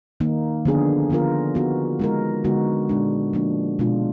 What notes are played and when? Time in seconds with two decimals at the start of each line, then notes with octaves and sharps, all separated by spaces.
0.20 D#3 A#3 D#4
0.65 D3 F3 B3 D4 G#4
1.10 D3 F3 B3 F4 A#4
1.55 F3 B3 D#4 F#4
1.99 G#3 D#4 A#4
2.44 D3 G#3 B3 D#4 F#4
2.89 A#2 G#3 D4
3.33 F3 A#3 D4
3.79 B2 G#3 D4 F4